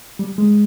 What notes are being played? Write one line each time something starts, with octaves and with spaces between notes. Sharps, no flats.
G3
G#3